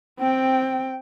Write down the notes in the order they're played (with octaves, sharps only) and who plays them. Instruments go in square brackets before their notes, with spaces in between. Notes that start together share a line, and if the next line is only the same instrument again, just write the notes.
[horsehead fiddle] C4 G5